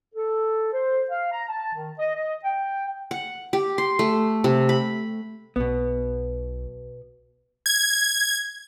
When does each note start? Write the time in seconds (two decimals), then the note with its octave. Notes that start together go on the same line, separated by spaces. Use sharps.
0.15 A4
0.72 C5
1.10 F5
1.32 A#5
1.49 A5
1.74 D#3
1.99 D#5
2.15 D#5
2.44 G5
3.11 F#5
3.53 G4
3.78 C6
3.99 A3
4.44 C3
4.69 B5
5.56 B1 B2 B3
7.66 G#6